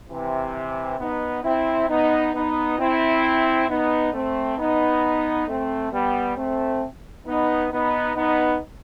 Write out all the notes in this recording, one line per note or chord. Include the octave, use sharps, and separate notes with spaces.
C3 E3
B3 D#4
C4 E4
B3 D#4
B3 D#4
C4 E4
B3 D#4
A3 C4
B3 D#4
A3 C4
G3 B3
A3 C4
B3 D#4
B3 D#4
B3 D#4